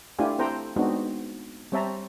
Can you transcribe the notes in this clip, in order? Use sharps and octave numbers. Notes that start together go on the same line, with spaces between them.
A3 D4 E4 F4 G4 G#5
C4 E4 A4 C5 G5 A#5
G#3 B3 C4 D4 D#4 F#4
G3 C4 C#5 E5 A5 A#5